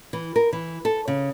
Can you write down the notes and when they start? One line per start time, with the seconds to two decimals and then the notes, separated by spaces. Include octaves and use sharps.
0.13 E3
0.36 A#4
0.53 E3
0.85 A4
1.08 C#3